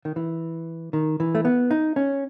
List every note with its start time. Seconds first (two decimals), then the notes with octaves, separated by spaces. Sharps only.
0.05 D#3
0.16 E3
0.93 D#3
1.20 E3
1.35 A3
1.45 B3
1.71 D#4
1.96 C#4